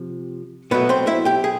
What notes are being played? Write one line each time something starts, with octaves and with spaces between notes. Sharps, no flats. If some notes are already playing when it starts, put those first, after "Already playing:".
Already playing: C3 F3
B2 F#3 A3 B3 B4
C4 C5
E4 E5
G4 G5
G#4